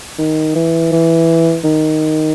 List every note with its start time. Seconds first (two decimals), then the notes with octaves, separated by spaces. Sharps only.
0.19 D#3
0.56 E3
0.92 E3
1.64 D#3